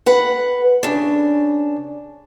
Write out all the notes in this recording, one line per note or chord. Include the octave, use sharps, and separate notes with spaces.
B4 F#5
C#3 D4